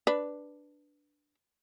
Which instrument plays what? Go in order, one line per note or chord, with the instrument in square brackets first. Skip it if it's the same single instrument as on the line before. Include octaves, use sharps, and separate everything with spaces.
[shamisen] D4 B4